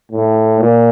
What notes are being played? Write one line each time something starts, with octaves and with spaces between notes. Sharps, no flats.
A2
A#2